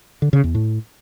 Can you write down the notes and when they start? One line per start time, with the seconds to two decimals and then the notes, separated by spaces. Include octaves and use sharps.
0.22 D3
0.33 C#3
0.44 E2
0.55 A2